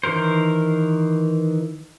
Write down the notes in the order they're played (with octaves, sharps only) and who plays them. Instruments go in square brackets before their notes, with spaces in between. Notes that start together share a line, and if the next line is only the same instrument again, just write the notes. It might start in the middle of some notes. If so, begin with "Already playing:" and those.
[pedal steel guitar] D#3 E3 A#4 C5